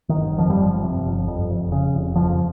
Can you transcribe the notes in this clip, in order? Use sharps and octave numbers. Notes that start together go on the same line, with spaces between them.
D#3
G1
F2 F3
G3
G1 F3
C3
G1
F2
F1
C#3
F1
F2 F3